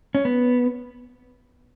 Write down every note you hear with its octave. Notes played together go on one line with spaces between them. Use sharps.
C#4
B3